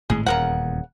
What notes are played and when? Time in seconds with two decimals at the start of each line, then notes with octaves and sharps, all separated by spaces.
0.10 G#1 A2 G#3 G#4
0.26 D#1 E2 C#3 A#4 F#5